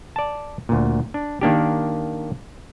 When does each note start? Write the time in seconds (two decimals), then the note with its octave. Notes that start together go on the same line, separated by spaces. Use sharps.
0.16 D5 A5
0.69 D2 A#2
1.14 D4
1.41 D#3 A#3 D4 G4